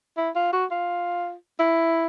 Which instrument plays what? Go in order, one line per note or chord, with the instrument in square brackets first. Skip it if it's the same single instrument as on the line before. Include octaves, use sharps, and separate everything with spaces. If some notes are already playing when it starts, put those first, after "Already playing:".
[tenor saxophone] E4
F4
F#4
F4
E4